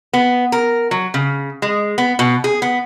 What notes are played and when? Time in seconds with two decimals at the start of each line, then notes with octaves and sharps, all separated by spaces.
0.13 B3
0.52 A#4
0.91 F#3
1.14 C#3
1.62 G#3
1.98 B3
2.19 B2
2.44 G#4
2.62 B3